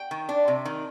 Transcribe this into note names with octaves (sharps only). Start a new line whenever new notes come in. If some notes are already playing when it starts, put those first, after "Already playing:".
Already playing: G5
D#3
D4
C3
D#3